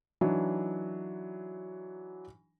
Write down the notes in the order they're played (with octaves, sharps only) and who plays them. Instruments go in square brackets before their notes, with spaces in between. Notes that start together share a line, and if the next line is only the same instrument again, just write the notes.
[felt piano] E3 F#3 D4 D#4